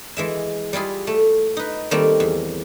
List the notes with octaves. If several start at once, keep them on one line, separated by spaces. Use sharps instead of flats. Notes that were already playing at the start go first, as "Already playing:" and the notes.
E3 G#3 E5
G3 E4 F4 G#4
A3
D#4 B4
D#3 G3 A3 A#3 C4
E2